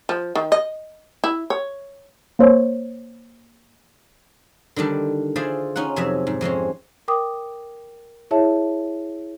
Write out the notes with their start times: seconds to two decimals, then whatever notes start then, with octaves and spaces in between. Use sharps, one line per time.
0.09 F3
0.35 D#3
0.52 D#5
1.24 E4
1.50 C#5
2.39 A#3 C5 C#5
4.76 D3 D#3 G3 D4
5.36 F4 G#4 C5 D5 E5
5.76 C#4 D#4 F4 F#5
5.96 F2 C3 F#3 G#4 E5
6.27 G#2
6.41 F2 G#3 C4 C#4
7.08 A#4 G5 D6 D#6
8.31 E4 G#4 C#5 E5 A5